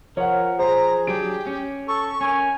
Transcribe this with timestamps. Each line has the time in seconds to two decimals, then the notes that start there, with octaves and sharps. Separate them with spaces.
0.17 F3 A#4 C#5 F#5
0.59 G#4 C5 A#5
1.07 F#3 D4 G4 D7
1.47 C#4
1.88 A4 C#6
2.21 C#4 A#4 G#5